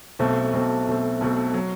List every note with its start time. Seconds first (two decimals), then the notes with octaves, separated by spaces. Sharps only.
0.19 B1 B2 A3 C4
0.53 B1 B2 A3 C4
0.87 B1 B2 A3 C4
1.21 B1 B2 A3 C4
1.54 F#3